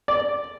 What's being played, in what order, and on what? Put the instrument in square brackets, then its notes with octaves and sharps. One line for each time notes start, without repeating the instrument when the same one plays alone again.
[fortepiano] D5